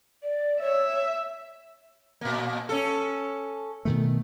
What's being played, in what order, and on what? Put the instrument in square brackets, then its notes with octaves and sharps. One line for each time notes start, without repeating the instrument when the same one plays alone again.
[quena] D5
[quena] C#5 [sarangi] E5
[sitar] A#2 A#3
C#4 A4
[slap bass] B2 D#3 A3